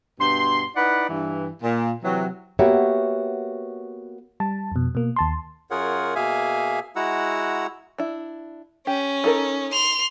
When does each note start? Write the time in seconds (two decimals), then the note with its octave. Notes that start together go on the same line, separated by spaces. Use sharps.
0.20 G2 B2 C6
0.76 D#4 E4 B4 D5 F#5
1.09 G2 E3
1.63 A#2
2.03 C3 E3 F#3
2.59 A#3 B3 F#4 G4 C#5 E5
4.40 G3 A5
4.72 F2 B2
4.95 B2 A#3
5.16 D#2 A5 C6
5.71 F#2 F4 G#4 A#4 C#5 F#5
6.15 B2 A#3 G#4 E5 F5 G#5
6.96 G#3 E4 F#4 F#5 A#5 E6
7.98 D4 E4
8.87 C#4 G4
9.24 D#4 A4 A#4
9.73 C6 F7